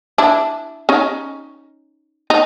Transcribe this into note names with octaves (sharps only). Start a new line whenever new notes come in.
D4 E4
C#4 D#4
D#4